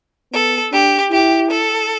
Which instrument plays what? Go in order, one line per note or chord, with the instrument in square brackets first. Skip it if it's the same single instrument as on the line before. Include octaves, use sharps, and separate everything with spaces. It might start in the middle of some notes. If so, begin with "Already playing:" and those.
[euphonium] B3 [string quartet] A4
[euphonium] D4 [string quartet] G4
[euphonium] E4 [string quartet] G4
[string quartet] A4